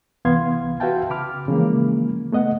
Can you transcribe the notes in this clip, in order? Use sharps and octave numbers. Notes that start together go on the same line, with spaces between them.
C2 E3 B3 F5 C6 G#6
F#4 B4 E5 F5 G5 A5
C#3 B5 D6 F6
C#3 E3 F3 G#3 A#3
A3 B3 D#5 F#5